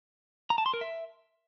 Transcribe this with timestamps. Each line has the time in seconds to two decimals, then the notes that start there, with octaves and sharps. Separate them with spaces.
0.50 A#5
0.58 A5
0.66 C6
0.74 A#4
0.81 E5